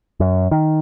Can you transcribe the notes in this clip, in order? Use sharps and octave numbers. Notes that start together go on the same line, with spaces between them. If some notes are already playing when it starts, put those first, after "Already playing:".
F#2
D#3